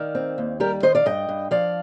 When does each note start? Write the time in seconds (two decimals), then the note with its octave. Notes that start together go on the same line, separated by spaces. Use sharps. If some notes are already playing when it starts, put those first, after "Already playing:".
Already playing: D#3 D5 F5
0.15 C4
0.38 D#2
0.60 G3 G4 A#4
0.83 D#3 C5 D#5
0.95 D5 F5
1.06 G2 D#5 G5
1.29 G2
1.51 F3 D5 F5